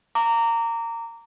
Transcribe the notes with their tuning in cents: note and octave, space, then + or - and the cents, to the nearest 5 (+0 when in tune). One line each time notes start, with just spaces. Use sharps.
A#5 -20 D6 -20